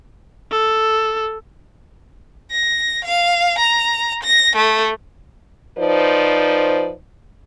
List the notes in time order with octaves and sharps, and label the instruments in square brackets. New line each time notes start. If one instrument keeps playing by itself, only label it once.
[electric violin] A4
[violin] A#6
F5
A#5
A#6
A3
[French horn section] F3 D#4 B4 C5 D5